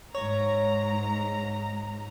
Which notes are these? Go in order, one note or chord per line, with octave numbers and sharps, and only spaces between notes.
G#2 C#5 A#5